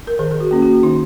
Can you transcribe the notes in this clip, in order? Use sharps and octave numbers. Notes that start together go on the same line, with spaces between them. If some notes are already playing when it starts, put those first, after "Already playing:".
A#4
D#3 G#4
G#4
F#4
A#3 C#4
F#4
D#3 D#4